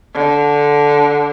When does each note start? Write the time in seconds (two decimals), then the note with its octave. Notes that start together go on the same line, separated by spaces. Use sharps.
0.14 D3